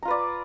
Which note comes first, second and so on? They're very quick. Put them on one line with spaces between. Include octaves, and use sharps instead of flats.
A#5 F4 B4 D5